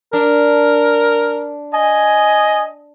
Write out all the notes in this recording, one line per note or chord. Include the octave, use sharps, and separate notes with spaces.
D4 A#4
D#5 G#5